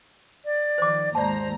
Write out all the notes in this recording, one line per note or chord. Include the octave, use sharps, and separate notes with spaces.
D5
D#3 F3 C5 D6
D#2 G#2 C5 D5 A5 A#5